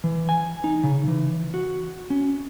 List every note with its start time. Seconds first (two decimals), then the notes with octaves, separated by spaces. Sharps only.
0.04 E3
0.29 G#5
0.64 D#4
0.83 C#3
1.08 E3
1.54 F#4
2.10 C#4